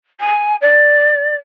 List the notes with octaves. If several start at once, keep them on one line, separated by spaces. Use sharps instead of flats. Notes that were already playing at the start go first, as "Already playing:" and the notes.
G#5
D5